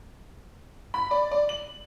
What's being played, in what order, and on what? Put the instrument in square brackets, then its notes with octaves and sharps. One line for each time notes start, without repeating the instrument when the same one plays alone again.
[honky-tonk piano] B5
D5
D5
F#7